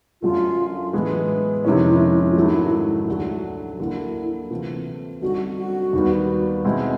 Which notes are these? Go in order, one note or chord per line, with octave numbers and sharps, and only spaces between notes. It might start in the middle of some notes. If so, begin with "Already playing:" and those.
F#2 D3 F#3 A3 F4
A2 E3 G#3 B3
F2 C3 D#3 G#3 C#4 E4
E4
E4
F4
G#2 D#3 F#3 A3 E4
D2 D3 F#3
D3 F#3 A#3 E4
C3 E3 A3 C4 F4
F#2 D3 G3 C4 D#4 F#4
F#4
D#2 D#3 G3 B3
B2 G#3 C4 E4